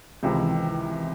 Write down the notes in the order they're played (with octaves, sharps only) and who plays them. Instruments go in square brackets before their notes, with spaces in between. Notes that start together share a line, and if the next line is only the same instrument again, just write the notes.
[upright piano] C#2 C3 D#3 [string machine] E3